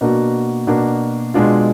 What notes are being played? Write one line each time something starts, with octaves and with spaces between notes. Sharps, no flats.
B2 A#3 D4 F#4
B2 A#3 D4 F#4
B2 G#3 D4 F4